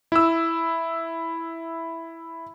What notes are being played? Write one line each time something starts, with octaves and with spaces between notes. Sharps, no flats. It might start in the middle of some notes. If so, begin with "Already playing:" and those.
E4 E6